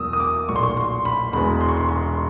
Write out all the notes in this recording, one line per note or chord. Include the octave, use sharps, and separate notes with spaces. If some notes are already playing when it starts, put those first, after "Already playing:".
Already playing: E2 B2 F#3 A#3 D#6 E6
D#6
D6
B1 A#2 F#3 C#6
C6
C#6
C6
B5
E1 E2 B2 G#3 B3 B5
C6
C#6
C6
C#6